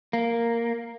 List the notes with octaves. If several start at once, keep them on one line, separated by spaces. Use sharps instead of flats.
A#3